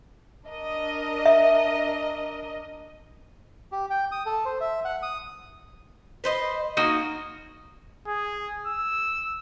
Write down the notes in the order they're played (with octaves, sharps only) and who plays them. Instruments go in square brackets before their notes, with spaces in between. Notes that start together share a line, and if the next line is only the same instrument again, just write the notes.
[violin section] D4 A#4 D#5
[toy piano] E5
[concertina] G4
G5
D#6
A4
C5
E5
F#5
D#6
[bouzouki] B4 C5 D#5
[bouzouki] A#3 [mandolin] D#4 F#4 D#5
[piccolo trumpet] G#4
E6